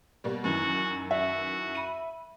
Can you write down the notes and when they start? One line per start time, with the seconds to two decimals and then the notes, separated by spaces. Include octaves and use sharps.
0.24 B2 G3 A#3
0.44 F#2 D#3 E3 F#4
1.11 F#4 E5
1.75 B5 D#7